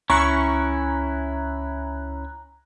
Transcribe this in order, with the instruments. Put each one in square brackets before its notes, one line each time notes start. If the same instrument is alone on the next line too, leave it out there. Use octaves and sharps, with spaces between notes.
[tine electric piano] C#2 [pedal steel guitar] C#4 E4 [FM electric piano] A#5 F#6 [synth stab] C#6